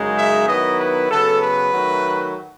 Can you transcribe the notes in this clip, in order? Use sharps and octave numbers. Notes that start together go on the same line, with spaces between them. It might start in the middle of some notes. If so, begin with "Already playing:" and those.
Already playing: F#2 C#3 G#3 D#4
E5
D#3 F#3 B3 E4 D#5
B4
C#3 F#3 B3 A4
B4
D#3 F#3 A3